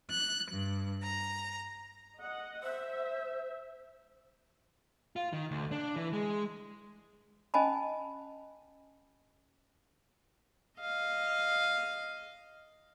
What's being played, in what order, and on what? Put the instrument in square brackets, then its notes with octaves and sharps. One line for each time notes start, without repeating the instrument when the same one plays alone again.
[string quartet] F#6
G2
A#5
[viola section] D#5 F#5
[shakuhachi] C5 [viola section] E5
[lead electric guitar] F4
D#3
D2
D4
E3
G#3
[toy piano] C#4 D#5 G#5 A5 B5
[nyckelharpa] D#5 F5